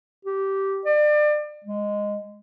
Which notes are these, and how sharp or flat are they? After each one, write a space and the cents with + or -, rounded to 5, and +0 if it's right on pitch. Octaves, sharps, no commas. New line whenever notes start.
G4 -15
D5 +30
G#3 -10